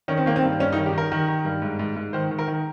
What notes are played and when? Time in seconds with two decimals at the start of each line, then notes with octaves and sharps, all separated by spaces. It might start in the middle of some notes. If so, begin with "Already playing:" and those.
0.08 D#3 C#4
0.17 C4
0.26 D#3 A#3
0.36 C4
0.43 G2
0.60 G2 C#4
0.73 D#4
0.77 D#3
0.86 G4
0.93 D#3 A#4
1.12 D#3
1.28 D#3
1.45 G2
1.62 G#2
1.79 G#2
1.96 G#2
2.13 D#3 C5
2.31 D#3
2.39 A#4
2.48 D#3